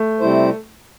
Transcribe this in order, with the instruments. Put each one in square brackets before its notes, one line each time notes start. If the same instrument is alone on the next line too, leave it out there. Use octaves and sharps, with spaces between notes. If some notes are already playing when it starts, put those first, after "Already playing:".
Already playing: [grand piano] A3
[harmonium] C3 G3 E4 C5